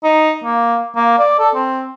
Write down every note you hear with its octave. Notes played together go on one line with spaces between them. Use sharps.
D#4
A#3
A#3
D5
A4
C4